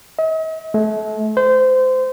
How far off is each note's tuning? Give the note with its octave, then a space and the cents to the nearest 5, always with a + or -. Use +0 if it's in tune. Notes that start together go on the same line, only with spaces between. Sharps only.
D#5 +45
A3 -35
C5 -25